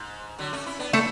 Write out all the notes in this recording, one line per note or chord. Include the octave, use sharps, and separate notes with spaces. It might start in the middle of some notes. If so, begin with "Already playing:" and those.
Already playing: G#2
D3 F#3
A3 C#4
C#4 E4
B3 D4
A3 C#4 E4 A4